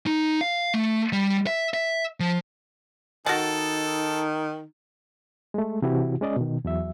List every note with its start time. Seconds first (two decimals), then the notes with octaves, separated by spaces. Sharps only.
0.07 D#4
0.41 F5
0.74 A3
1.12 G3
1.47 E5
1.74 E5
2.20 F3
3.26 D#3 D#4 F#4 A4 A5
5.54 G#3 A3
5.82 C3 E3 E4 F#4 G4
6.21 G#3 C#4 D5 D#5
6.36 B2 D#3
6.65 E2 F#3 E5